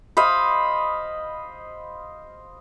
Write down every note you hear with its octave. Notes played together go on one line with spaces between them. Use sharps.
C5 D#5 F5 B5